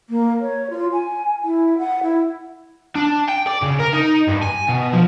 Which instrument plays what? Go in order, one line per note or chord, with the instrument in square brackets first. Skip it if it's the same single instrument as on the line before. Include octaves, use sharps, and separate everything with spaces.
[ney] A#3
C#5
F4
G#5
E4
F#5
E4
[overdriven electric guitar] D4
G5
D5
C#3
A#4
D#4
G2
G#5
B2
F3